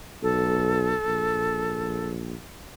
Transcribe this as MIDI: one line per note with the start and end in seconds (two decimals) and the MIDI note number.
0.23 0.93 35
0.23 2.10 69
1.06 2.36 34